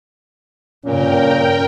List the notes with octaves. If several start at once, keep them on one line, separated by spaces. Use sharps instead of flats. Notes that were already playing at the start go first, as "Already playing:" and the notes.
G2 A#2 C#3 C#4 A#4 G5